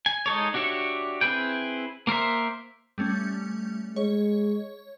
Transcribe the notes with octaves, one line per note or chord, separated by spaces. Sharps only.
G#5
G#3 D#4 A4 C#5
D4 F#4 G4 C#5 E5
C4 E4 G#4 B4 G5
A#3 A#4 C5 E5
G3 A3 C#4
G#3 C#5